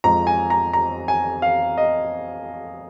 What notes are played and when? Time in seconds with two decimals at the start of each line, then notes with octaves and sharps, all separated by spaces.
0.04 F2 F3 G#3 A#5
0.27 G#5
0.50 A#5
0.73 A#5
1.08 G#5
1.42 F5
1.78 D#5